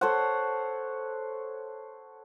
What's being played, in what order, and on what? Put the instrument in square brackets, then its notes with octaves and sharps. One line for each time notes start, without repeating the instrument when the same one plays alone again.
[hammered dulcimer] A4 C5 C#5 F#5